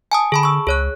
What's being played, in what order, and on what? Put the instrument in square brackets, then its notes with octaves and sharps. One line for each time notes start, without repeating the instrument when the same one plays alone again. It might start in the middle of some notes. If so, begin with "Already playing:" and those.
[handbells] G#5 A5 D#6
[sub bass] D3 [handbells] G#4 A5 B5
[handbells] C#6 E6
[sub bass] C#2 [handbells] G#4 C#5 F#6